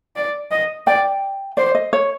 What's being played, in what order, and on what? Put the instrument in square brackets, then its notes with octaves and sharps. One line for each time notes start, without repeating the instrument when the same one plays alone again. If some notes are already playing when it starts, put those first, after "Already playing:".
[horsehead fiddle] D5
D#5
[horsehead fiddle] D5 [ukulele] G5
[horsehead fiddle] C5 [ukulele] D5
[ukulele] D#5
C#5